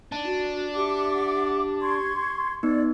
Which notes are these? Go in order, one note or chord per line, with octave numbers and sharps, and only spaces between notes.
D4 D#4 A5
F#4
G4 E5 F#5 D6
C6 C#6 G#6
B3 D#4 D5